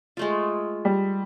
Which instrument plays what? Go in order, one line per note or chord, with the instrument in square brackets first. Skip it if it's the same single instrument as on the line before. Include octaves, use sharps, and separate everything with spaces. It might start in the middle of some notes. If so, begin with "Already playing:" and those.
[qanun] G#3 A3 F4
[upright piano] G3